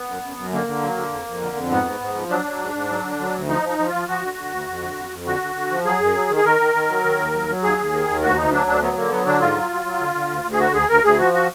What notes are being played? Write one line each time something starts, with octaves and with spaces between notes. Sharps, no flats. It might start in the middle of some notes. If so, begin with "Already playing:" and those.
Already playing: B3
F#2
F#2
F#2
D3 A#3
D3
F#3
D3
F2
F2
D3
F2
G#2 B3
G#2
G#2
F3
F#3 D4
F#3
G#2
G#2
F#3
D3
F#3
D2
F3 D#4
F3 D#4
F3
F4
F3
F3 F#4
D3
D3
D2
F2
D3
F2
F2
D3 F#4
D3
D3
F3
F#3 G#4
F#2
F#3
D#3
G#4
D#3 A#4
D#3
D#3
F#3
D#3
D#2
F#3
F#3
D#2 G#4
D#2
D#3
D#2
D2 F#4
D2 D#4
F#3 D4
D2 D4
F#3 B3
D3 A#3
F#3 B3
D3 D4
G#2 F4
F#3
F#3
F#3
D3
D3
D2
D2
G#4
D3 F#4
D2 G#4
D2 A#4
D2 G#4
F3 F#4
F#4